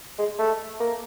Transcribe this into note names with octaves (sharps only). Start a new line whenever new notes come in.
G#3
A3
A#3